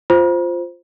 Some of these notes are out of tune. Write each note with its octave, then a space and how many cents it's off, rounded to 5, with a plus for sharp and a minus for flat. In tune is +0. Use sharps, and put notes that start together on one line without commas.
F4 +0 C5 +0